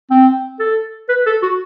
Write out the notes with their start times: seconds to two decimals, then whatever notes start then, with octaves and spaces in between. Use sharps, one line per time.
0.11 C4
0.60 A4
1.09 B4
1.26 A4
1.42 F#4